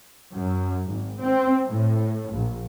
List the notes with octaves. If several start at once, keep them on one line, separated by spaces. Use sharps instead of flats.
F#2
G#1
C4
A2
A#1